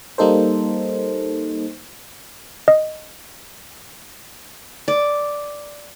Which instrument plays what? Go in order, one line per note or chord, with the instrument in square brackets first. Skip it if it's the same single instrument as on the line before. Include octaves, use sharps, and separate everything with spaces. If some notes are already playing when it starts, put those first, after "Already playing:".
[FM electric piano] G3 A#3 D#4 A4 C5
[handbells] D#5
[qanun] D5